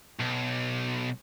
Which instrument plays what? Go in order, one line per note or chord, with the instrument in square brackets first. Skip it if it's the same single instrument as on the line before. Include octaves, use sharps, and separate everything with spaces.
[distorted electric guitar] B1